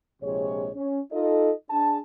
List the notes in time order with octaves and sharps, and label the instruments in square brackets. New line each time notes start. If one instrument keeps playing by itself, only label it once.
[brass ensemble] A#1 C3 F3 G#3 G#4 C#5
C#4
D#4 F4 A4 D#5
D4 G#4 A5